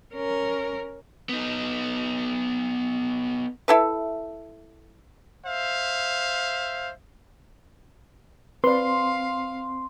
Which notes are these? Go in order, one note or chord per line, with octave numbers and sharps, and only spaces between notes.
C#4 A#4
B3 D#4
E4 A4 B4
C5 E5 F5
C4 B4 D5 F5 C6